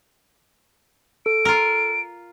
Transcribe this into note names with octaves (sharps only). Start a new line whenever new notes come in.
A4 D7
F4 A#4